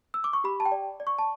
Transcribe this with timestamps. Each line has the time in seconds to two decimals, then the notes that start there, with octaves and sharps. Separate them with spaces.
0.14 E6
0.24 D6
0.33 C#6
0.44 G4 B5
0.60 A5
0.65 G5
0.72 D5
1.00 D5
1.07 C#6
1.18 A5